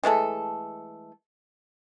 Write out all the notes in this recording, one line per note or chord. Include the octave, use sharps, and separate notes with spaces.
E3 G#3 A3 A4